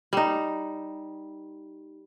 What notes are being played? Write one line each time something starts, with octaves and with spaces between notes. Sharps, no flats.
G3 D#4